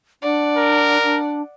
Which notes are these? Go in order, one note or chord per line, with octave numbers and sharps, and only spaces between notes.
D4 D5 F#5
A#4
D4